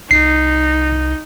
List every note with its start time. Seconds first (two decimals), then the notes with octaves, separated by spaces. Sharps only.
0.11 C2 D#4 C7